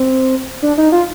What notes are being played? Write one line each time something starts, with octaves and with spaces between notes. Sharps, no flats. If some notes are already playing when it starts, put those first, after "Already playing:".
Already playing: C4
D4
D#4
F4